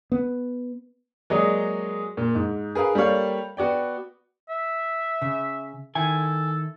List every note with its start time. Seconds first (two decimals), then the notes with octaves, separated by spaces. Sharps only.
0.12 B3
1.30 F#3 G#3 A#3 G#4 D5 D#5
2.17 A#2
2.35 G#2
2.75 G#4 A#4 B4 F5
2.95 G3 A#3 A4 C#5 F5
3.57 B3 F#4 D5 G5
4.49 E5
5.22 C#3
5.95 D#3 E4 A4 G#5